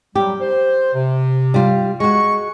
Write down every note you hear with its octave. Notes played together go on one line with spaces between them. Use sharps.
F#3 G3 G4
C5
C3
G3 F4
G#3 F#4 C#6